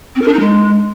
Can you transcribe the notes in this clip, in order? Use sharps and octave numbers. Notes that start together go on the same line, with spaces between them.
C4
A#4
D4
D#4
G#3